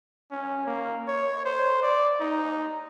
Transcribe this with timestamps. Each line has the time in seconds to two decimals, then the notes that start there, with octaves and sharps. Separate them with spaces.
0.31 C#4
0.66 A#3
1.08 C#5
1.45 C5
1.83 D5
2.20 D#4